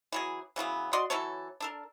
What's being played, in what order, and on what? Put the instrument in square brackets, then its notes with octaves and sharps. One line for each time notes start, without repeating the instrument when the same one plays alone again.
[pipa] E3 F#3 G#4
C#3 E3 F#3 B3
F#4 D5 D#5 C6
E3 F#3 A4 C#5
D4 A4 A#4